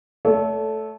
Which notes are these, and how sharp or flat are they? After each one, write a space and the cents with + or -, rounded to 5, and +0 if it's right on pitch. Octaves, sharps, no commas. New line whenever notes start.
A3 -5 A4 -10 C#5 +45